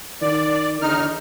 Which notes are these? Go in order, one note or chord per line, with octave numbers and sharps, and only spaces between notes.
D#3 D5
E2 D3 D#4 F6